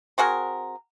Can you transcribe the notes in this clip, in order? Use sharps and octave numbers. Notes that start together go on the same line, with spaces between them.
C4 F#4 G#4 A#4